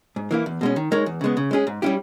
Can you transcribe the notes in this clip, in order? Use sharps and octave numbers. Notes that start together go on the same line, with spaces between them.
G#2
E3 A#3 E4
E2
B2 G#3 C#4
D#3
G#3 D#4 A#4 C#5
E2
C#3 G#3 B3
C#3
G#3 C#4 G#4
G#2
G3 C#4 E4 G4